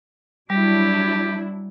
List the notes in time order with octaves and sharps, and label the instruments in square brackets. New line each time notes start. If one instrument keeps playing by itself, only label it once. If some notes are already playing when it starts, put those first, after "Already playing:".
[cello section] F#3 D4 E4 [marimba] G3 [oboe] G4